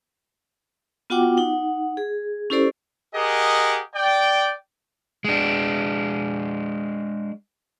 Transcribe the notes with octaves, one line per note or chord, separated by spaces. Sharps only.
B3 F4 F#4 F#5 G5 D6
D#4 F#5
G#4
C#4 E4 G4 A4 C5 D5
G4 G#4 A#4 D#5 F#5
D5 G5
G#3 D4